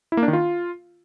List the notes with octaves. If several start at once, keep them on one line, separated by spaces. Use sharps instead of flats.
E4
A#3
D4
D#3
F4